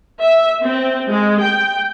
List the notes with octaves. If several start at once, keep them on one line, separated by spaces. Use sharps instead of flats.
E5
C4
G#3
G5